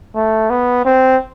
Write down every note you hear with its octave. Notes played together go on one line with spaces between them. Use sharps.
A3
B3
C4